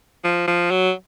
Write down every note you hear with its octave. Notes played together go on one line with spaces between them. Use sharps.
F3
F3
F#3